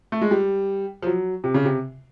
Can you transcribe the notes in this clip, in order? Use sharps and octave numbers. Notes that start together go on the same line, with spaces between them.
A3
G#3
G3
F3
F#3
C3
C#3
C3